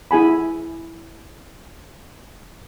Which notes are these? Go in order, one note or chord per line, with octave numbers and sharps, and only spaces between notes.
E4 G#4 G#5 B5